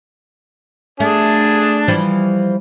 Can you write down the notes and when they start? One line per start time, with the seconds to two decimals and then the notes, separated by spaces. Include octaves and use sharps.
1.00 A3 D4 G#4 A5
1.88 E3 F3 G3